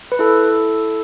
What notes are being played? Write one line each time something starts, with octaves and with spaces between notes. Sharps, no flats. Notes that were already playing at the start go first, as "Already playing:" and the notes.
B4
E4 A4